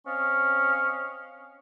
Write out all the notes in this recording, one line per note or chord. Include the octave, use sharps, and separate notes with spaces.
C4 C#4 D#5 F5